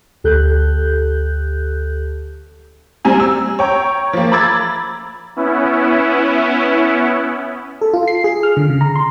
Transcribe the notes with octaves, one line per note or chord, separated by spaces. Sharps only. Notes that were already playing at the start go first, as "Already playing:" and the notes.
D2 G4 A4 F#6 G6
G3 C4 G#5 A#5
E6
C#5 G5 A#5
F3 A#3
A#5 B5 D6 E6 G#6 A6
B3 C#4 E4
A4
F4
C7
G#4
F6
D3
C#3
A#5
C6